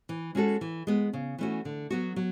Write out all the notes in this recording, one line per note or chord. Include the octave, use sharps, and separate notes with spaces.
E3
G#3 C#4 F#4 A4
E3
G#3 B3
C#3
E3 A3 C#4 F#4
D3
F#3 B3 F#4
F#3